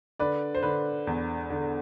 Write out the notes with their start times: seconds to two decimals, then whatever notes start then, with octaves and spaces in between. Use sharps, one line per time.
0.19 D3 B4 D5
0.55 C5
0.63 D3 B4
1.07 E2
1.50 D3